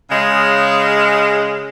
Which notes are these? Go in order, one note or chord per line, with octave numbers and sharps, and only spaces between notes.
C#3 G#3